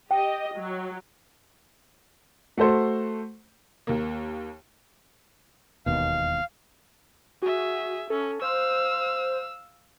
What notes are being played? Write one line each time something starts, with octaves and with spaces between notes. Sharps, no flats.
G4 D#5 G5
F#3
A3 F#4 A4 C5
D#2 A#3
E1 D#2 B2 F5
F#4 G#4 E5
C#4 A4
C5 F5 E6